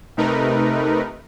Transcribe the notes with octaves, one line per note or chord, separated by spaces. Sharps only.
C3 A3 D#4 A#4 B4